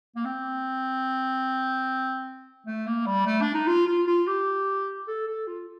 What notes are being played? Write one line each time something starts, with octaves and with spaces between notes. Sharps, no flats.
A#3
C4
A3
A#3
G3
A3
D4
D#4
F4
F4
F4
G4
A4
A4
F4